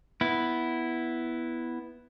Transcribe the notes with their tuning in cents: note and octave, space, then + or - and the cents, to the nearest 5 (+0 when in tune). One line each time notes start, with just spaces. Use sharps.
B3 +0 E4 +0